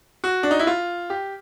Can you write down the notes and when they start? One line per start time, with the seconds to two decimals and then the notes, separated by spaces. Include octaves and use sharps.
0.24 F#4
0.43 D4
0.51 D#4
0.59 E4
0.67 F4
1.10 G4